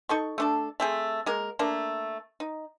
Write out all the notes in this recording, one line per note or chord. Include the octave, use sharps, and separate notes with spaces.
D#4 A4 C#6
A3 D4 A4
A3 C4 G#4
G#3 A#3 A#4
A3 A#3 D4
D#4